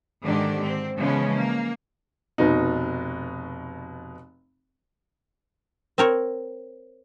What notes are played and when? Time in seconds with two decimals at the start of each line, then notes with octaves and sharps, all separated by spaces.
0.23 G#2 D3 D#3 D4 G4
0.64 C4
0.97 C#3 E3 F3 G#3 B3 C#4
1.35 A#3
2.38 F1 B2 D#4
5.98 C4 A#4 C#5